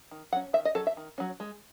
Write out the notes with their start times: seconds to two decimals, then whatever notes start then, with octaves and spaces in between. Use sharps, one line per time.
0.11 D#3
0.32 F#3 F#5
0.36 C#4
0.53 D#3 E5
0.65 D#5
0.75 F#3 C#4 A4
0.87 E5
0.97 D#3
1.18 F#3 C#4
1.40 G#3